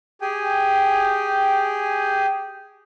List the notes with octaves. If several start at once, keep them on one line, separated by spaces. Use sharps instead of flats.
G4 G#4 G5 G#5